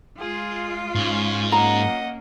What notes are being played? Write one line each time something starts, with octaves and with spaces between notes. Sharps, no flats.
G#3 F4 G#4
G#2 C#4
A#3 C#4 F4 D#5 F#5 A#5